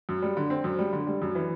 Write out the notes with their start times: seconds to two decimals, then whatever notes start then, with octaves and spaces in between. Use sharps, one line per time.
0.09 F#2
0.22 G3
0.37 D3
0.50 C4
0.64 F#2
0.79 G3
0.93 D3
1.07 G3
1.22 F#2
1.35 E3